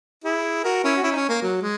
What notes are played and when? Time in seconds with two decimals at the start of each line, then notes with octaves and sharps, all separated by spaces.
0.24 E4 G#4
0.64 F#4 A#4
0.84 C#4 E4
0.96 F#4
1.03 C#4 E4
1.12 D#4
1.16 C#4
1.29 A#3
1.42 F#3
1.62 G#3